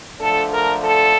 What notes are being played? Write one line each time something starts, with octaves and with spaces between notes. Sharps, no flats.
D3 F3 A3 D4 A4
A#4
A4